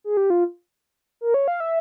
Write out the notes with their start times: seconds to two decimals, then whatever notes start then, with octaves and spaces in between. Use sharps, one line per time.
0.04 G#4
0.17 G4
0.30 F4
1.21 A#4
1.34 C#5
1.48 F5
1.60 E5